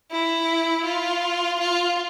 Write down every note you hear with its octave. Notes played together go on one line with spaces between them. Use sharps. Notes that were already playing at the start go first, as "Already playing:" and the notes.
E4
F4
F4